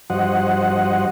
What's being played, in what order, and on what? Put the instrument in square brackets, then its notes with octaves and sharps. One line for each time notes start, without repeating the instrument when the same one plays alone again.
[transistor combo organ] G2 F3 F#4 C5 D#5 F#5